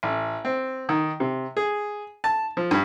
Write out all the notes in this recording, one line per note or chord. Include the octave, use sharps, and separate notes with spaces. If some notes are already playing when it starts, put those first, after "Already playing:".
A1
C4
D#3
C3
G#4
A5
F3
G2